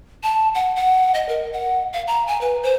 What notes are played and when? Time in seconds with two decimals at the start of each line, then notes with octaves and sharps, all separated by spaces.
0.23 A5
0.55 F#5
0.76 F#5
1.14 D#5
1.29 A#4
1.53 F#5
1.93 F5
2.07 A#5
2.28 G#5
2.41 B4
2.63 C5